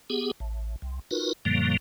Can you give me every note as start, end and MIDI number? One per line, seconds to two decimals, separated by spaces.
0.10 0.31 59
0.10 0.31 67
0.10 0.31 68
0.40 0.76 33
0.82 0.99 36
1.11 1.33 63
1.11 1.33 65
1.11 1.33 66
1.11 1.33 70
1.11 1.33 71
1.45 1.77 42
1.45 1.77 46
1.45 1.77 50
1.45 1.77 53
1.45 1.77 55
1.45 1.77 58